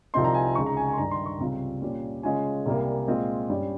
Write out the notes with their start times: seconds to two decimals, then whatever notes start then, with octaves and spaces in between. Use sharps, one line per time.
0.14 C2 C3 F3 C4 D#4 C6
0.24 A#5
0.34 G#5
0.55 C#2 C#3 G#3 D#4 C#6
0.66 A#5
0.77 G#5
0.87 G#5
0.93 C6
0.98 G2 D#3 G3 A#5
1.11 C6
1.26 C#6
1.40 C#2 C3 G3 C4 F4
1.82 A#2 G3 C#4 F4
2.23 C#3 G#3 C#4 F4 G#5
2.66 C2 C3 G3 A#3
3.08 A#2 G#3 C4 F4
3.49 G2 G3 C#4